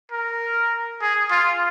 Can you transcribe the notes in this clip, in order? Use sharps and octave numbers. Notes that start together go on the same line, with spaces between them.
A#4
G#4
F4